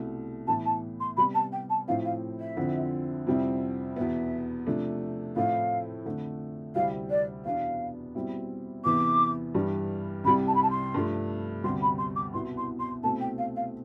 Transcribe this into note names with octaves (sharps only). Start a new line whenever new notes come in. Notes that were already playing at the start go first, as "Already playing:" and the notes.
Already playing: C2 B2 A3
A2 E3 B3 E4 A5
A5
C6
C3 G3 B3 B5
A5
G5
A5
A2 F3 C4 E4 F5
F5
E5
F2 D3 F3 C4 E4
F2 C3 G3 C4 E4
E2 B2 B3 E5
C3 F3 A3 D4
A2 F3 A3 C4 E4 F5
F2 D3 A3 D4
D2 C3 G3 C4 E4 F5
D5
E2 B2 B3 D4 F5
B2 G3 C4 E4
E2 C3 E3 B3 D6
G2 E3 G3
C2 C3 G3 B5
A5
B5
A5
C6
G2 F3 A3
D2 C3 G3 B3 C6
B5
C6
D6
C2 B2 B3 E4 C6
C6
C6
C2 B2 A3 C4 A5
G5
F5
F5